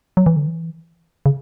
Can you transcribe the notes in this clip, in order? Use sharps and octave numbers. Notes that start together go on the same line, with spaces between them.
F#3
E3
D3
E3
C#3